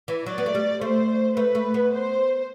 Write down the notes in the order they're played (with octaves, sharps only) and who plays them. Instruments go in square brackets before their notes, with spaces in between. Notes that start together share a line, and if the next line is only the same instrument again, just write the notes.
[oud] E3
[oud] F#3 [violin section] D5
[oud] B3
A3
G3
[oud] A3 [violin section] C5
[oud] A3 [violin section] B4
[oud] A3
B3
[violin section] C5